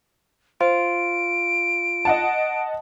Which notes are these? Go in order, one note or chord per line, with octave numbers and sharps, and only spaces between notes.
F4 C5 D7
D#5 F#5 A5